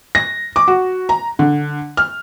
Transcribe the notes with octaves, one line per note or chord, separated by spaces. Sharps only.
A#6
D6
F#4
A#5
D3
F6